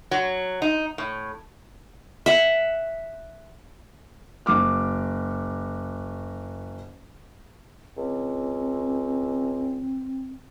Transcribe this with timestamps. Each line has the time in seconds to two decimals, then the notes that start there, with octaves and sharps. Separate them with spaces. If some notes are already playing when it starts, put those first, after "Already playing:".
0.11 F#3
0.62 D#4
0.98 A2
2.26 E5 F#5
4.46 F#1 F#4 D6 F6
7.97 C#2 C4